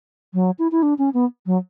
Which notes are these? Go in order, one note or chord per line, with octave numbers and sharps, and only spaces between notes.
F#3
E4
E4
D4
C#4
B3
F#3